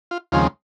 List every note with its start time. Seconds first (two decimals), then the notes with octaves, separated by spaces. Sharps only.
0.11 F4
0.32 D#2 C#3 F3 G#3 C4 F4